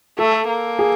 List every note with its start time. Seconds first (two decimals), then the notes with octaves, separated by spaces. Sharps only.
0.18 A3 A4
0.48 A#3
0.79 G#4